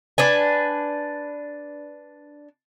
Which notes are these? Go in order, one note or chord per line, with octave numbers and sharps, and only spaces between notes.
D4 B4 G#5